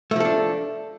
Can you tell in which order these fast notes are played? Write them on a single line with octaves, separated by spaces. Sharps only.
A3 F3 A4 D4